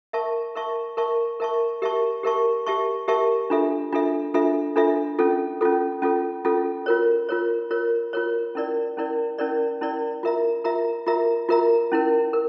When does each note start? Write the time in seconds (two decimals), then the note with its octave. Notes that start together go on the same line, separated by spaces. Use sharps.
0.13 A#4 E5 A5 C#6
0.56 A#4 E5 A5 C#6
0.97 A#4 E5 A5 C#6
1.40 A#4 E5 A5 C#6
1.82 G4 A#4 E5 A5 C#6
2.23 G4 A#4 E5 A5 C#6
2.66 G4 A#4 E5 A5 C#6
3.08 G4 A#4 E5 A5 C#6
3.50 D4 F4 A4 E5
3.93 D4 F4 A4 E5
4.34 D4 F4 A4 E5
4.76 D4 F4 A4 E5
5.19 C#4 F4 A4
5.61 C#4 F4 A4
6.02 C#4 F4 A4
6.45 C#4 F4 A4
6.86 F4 A#4 C#5
7.29 F4 A#4 C#5
7.71 F4 A#4 C#5
8.13 F4 A#4 C#5
8.55 C#4 E4 A#4 D5
8.97 C#4 E4 A#4 D5
9.38 C#4 E4 A#4 D5
9.81 C#4 E4 A#4 D5
10.23 F4 A#4 E5 A#5
10.64 F4 A#4 E5 A#5
11.06 F4 A#4 E5 A#5
11.49 F4 A#4 E5 A#5
11.92 C#4 E4 A#4
12.33 A#4